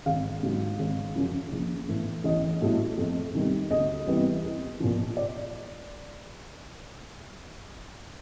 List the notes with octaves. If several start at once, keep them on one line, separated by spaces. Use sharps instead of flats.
G#1 F5
G#2 D#3 F#3
G#1
F#2 C#3 F3
A#1
A2 E3 A3
A1 D#5
A2 F#3 A3
F2
C3 D#3 G3
D2 D#5
C3 E3 G3 B3
C2
A#2 F3
D5